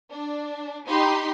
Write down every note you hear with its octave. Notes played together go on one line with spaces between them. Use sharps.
D4
D#4 G4 B5 C6